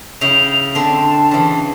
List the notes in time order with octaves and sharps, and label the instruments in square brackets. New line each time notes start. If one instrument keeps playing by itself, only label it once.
[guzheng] C#3 E4 G5 [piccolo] F7
[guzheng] D3 C4 [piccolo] A5
[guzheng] C#3 E3